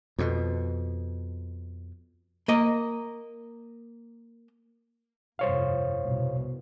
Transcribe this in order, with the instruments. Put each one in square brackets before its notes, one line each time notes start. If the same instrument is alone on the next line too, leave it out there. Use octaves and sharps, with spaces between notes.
[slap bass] F2 B2
[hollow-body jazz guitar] A#3 D#5
[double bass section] G1 C2 F2 [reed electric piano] C5 C#5 F5
[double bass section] C2 B2